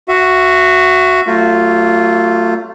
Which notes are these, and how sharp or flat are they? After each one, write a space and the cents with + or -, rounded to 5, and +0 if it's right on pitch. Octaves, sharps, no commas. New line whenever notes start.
F#4 +0 E5 +25
F#3 +30 A3 +30 F4 +0